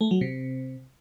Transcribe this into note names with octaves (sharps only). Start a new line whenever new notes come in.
A3
F#3
C3